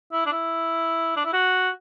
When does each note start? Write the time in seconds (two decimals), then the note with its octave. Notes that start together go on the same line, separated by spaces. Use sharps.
0.12 E4
0.26 D4
0.32 E4
1.16 D4
1.25 E4
1.33 F#4